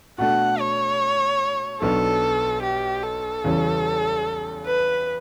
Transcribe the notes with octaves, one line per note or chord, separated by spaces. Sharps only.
B2 A3 D4 A4 F#5
C#5
B1 B2 F#3 B3 D4 A4
G4
A4
E2 C#3 E3 G3 C#4
B4